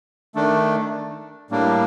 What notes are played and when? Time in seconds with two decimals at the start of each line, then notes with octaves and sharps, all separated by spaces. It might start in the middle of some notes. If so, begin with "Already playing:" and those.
0.35 D#3 A3 D4
1.51 A2 G3 A#3 D4